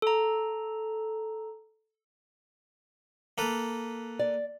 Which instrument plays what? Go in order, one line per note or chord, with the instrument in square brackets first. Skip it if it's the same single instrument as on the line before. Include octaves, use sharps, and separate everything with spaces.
[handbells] A4 A#5
[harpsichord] A#3 A4 B4
[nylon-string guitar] D5